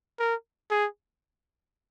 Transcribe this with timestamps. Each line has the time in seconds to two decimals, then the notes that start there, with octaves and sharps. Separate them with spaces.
0.19 A#4
0.71 G#4